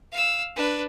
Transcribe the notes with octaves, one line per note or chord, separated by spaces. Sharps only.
F5 E6
D4 B4